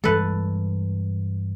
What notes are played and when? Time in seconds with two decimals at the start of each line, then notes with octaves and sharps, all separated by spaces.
0.04 G2 E3 G#3 A4 B4